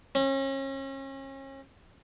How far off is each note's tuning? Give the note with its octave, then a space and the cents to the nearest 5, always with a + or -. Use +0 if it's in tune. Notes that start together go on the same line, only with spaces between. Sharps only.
C#4 -35